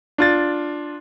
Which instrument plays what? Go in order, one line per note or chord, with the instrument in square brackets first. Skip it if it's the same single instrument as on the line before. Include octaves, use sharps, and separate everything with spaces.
[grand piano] D4 F4 A6